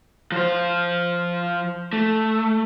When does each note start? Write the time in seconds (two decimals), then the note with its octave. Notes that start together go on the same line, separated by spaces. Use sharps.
0.32 F3 C5
1.93 A3